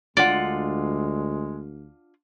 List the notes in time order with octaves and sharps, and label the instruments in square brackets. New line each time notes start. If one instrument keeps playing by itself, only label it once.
[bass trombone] D2 [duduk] G#3 [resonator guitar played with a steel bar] D4 F4 F#5 [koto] D5